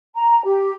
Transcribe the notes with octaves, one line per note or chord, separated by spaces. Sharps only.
A#5
G4